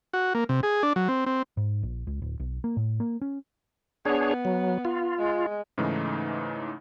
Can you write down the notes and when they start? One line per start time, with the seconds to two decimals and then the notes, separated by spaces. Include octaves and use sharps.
0.14 F#4
0.35 A#3
0.49 C3
0.63 G#4
0.83 D4
0.96 F#3
1.09 C4
1.26 C4
1.57 G#2
1.83 A#1
2.07 C#2
2.22 D1
2.40 B1
2.64 A#3
2.77 A2
3.00 A#3
3.21 C#4
4.05 B3 D4 G#4 C#5
4.45 F#3
4.85 F4
5.18 G#3
5.78 G#2 C#3 E3 A3 D#4